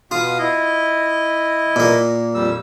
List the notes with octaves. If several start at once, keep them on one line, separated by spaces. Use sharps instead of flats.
B2 F4 F5 D#6
E4 D#5
A#2 A#3
F2 G3 E6